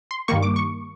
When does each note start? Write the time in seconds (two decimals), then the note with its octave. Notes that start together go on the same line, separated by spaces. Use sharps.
0.11 C6
0.28 G2 D#3 G3 A#3 C#6
0.42 D6
0.56 C#6